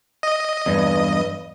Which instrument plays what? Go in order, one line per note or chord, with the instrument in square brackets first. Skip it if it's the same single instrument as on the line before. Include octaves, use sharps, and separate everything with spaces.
[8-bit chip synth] D#5
[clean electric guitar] E2 G2